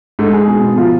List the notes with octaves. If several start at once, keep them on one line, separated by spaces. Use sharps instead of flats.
G#2 A4
G#2 G#4
B2 G#4
B2
F3 F4